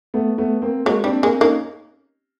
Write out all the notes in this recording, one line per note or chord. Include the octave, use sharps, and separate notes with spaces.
A3 B3
A3 B3
A#3 C4
F#3 G#3 A#3
G3 C4 D4
G#3 A#3 C4
A#3 C#4 D#4